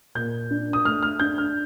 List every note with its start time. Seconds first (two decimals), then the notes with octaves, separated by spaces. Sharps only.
0.15 A#2 G6
0.50 D4
0.73 D#6
0.85 A3 F6
1.03 F6
1.20 D4 G6
1.38 F6